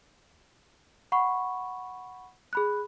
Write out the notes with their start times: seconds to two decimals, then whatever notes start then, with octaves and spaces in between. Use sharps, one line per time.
1.12 F#5 B5 C#6
2.53 G#4 B5 F#6